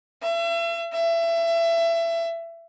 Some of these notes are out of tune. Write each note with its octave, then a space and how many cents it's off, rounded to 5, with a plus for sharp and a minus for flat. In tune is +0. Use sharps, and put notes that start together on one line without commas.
E5 +40
E5 +25